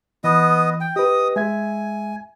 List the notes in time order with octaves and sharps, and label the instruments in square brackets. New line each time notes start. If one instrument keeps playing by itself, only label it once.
[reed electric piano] E3 [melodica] B3 D#5
[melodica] G5
[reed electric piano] G4 B4 [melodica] D#5 D#6
[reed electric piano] G#3 E5 G#6 [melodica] G#5